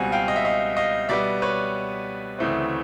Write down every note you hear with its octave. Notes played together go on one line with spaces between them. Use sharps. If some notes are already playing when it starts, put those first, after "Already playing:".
Already playing: C#2 B2 G3 C4 F#5 G#5
F5 G5
D#5
E5
D#5 F5
D#5 F5
B2 G3 B3 D5 E5
B4 C#5
D2 C#3 E3 A3 C4